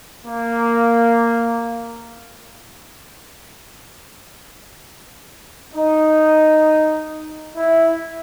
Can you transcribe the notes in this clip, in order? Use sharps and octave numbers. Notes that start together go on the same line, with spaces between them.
A#3
D#4
E4